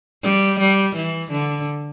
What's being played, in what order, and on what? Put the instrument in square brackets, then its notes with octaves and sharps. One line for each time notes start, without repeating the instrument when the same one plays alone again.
[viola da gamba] G3
G3
E3
D3